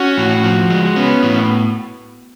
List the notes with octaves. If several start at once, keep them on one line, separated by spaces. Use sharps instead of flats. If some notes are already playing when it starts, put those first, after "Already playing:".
Already playing: C#4 F#4
A2
F3
G#3
B3 C#4
A2